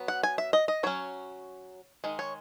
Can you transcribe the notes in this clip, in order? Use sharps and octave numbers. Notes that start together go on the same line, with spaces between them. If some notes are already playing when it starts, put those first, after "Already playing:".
Already playing: F#3 B3
F#5
G#5
E5
D#5
D#5
F#3 C#4 C#5
D#3 G#3
C#5